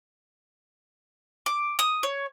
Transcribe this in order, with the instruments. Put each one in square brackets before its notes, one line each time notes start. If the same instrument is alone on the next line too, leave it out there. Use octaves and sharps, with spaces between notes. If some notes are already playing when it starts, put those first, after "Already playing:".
[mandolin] D6
D#6
C#5